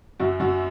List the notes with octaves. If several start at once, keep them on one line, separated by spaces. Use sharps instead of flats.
F#2 F#4
F#2 F#4